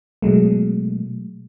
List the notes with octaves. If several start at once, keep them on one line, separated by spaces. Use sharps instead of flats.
B2 F#3 G#3 A3